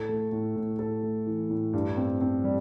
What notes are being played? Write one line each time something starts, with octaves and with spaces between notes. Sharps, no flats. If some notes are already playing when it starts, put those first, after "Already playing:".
Already playing: A2 A4
A3
A2
A2
A2 A4
A3
E3
A2
G2
C4
C4
G3